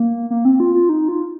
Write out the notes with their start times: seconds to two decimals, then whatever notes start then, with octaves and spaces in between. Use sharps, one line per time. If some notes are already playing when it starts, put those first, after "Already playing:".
Already playing: A#3
0.30 A#3
0.45 C4
0.60 F4
0.74 F4
0.89 D#4
1.08 F4